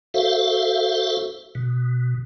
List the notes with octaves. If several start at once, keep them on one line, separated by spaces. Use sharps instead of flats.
F#4 A4 C5 E5 F5
B2